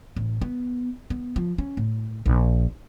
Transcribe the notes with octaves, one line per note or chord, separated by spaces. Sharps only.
A1
B3
B3
F3
C#4
A2
A#1